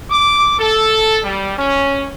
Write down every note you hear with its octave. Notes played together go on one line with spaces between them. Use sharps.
D6
A4
G3
C#4